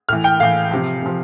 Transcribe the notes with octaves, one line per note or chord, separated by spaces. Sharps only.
A2 E3 F6
G5
A2 E3 F5
C3 F3
C3 F3